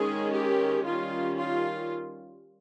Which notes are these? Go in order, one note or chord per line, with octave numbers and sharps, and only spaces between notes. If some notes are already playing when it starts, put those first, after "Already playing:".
Already playing: D#3 G#3 C#4 G#4
G4
D#3 G3 C#4 F4
F4